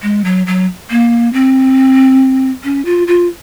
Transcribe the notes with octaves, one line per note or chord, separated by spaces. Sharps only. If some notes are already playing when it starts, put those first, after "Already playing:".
G#3
F#3
F#3
A#3
C4
C#4
F4
F4